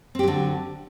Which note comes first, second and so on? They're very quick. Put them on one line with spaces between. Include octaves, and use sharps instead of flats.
C4 G4 F#3 D3